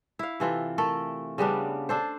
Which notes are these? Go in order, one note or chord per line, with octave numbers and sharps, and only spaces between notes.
E4 F5
C3 E3 F4 A4
A3 A4 A#4
C#3 G3 B3 D4
D4 A4 C5